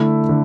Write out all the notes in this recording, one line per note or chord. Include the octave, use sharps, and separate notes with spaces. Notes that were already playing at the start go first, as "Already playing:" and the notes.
Already playing: D3 A3 E4
D3